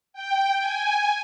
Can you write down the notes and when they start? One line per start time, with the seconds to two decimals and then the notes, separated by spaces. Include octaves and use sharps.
0.13 G5
0.59 G#5